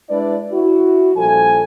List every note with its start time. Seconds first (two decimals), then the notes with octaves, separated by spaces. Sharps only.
0.10 G#3 D4 E4 B4 D5
0.53 E4 F#4
1.16 A#1 F3 G3 A4 G#5